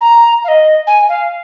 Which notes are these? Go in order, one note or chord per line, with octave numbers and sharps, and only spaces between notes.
A#5
F5
D#5
G#5
F5